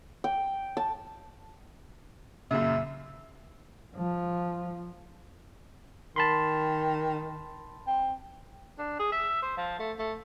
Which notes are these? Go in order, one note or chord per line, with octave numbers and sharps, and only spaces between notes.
G5
A5
F#2 A#2 C#3 E5
F3
D#3 A5 B5 C6
C4
D4
G#4
E5
C5
F3
A3
A3